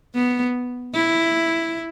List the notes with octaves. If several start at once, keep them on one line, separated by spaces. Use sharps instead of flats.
B3
E4